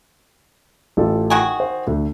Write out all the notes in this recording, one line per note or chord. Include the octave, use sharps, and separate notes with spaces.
A1 F4 A4
D#3 F#4 G#4
C5
D2